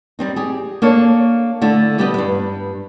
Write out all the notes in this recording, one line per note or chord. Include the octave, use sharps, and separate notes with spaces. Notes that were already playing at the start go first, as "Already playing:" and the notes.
G3 C4 D#4
G4 G#4
A#3 D4 A4 C#5
D3 A3 E4
G3 B3 G4 B4 D#5
G2 B4